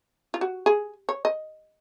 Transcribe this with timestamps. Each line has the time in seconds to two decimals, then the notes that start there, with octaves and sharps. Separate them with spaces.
0.34 F4
0.41 F#4
0.66 G#4
1.09 C#5
1.25 D#5